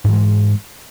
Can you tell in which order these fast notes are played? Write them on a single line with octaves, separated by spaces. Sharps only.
G#2 E3 G#3